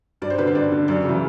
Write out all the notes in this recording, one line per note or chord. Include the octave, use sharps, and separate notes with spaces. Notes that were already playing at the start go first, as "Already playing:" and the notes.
G2 D5
C5
D3 B4
C5
G2 D5
D3
F#2 D5
C#3 E3